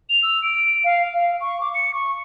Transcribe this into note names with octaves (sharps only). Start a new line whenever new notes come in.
F7
E6
D7
F5
F5
C#6
D6
C#7
C#6